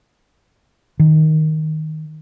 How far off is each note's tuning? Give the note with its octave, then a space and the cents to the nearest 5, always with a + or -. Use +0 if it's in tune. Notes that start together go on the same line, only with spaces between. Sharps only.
D#3 +5